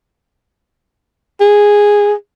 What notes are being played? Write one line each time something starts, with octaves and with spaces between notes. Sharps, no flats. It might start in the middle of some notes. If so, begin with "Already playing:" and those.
G#4